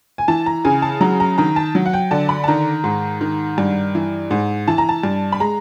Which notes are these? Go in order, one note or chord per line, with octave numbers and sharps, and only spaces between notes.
G#5
E3 A5
A#5
C#3 G#5
A5
F#3 A#5
A#5
D#3 A#5
A5
F#3
F#5
G5
D3 A5
B5
A5
D#3 A#5
G#2
D#3
G2
E3
G#2
E3 A5
A#5
A5
G2
B5
G#3 A#5